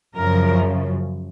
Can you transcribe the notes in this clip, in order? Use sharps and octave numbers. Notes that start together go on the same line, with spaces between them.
F#2 C#3 F3 A#4